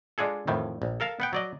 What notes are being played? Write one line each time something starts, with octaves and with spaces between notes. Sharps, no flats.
G#3 D4 F4 G#4 A4
F2 A2 D#3 E3
A#1
A4 A#4 F5 A5
B3 F#5 G5
F#3 D5 D#5